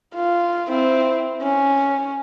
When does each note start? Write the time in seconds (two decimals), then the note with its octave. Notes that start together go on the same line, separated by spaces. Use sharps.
0.14 F4
0.69 C4 E4
1.42 C#4